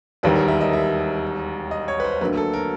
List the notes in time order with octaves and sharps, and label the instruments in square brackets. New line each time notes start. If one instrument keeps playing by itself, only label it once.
[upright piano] E1 D#2 D#3 G3 [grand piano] B4
[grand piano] A#4
E5
D#5
E5
D#5
C#5
B4
C5
[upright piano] D2 D3 F#3 A#3 [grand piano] B4
[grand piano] A4
A#4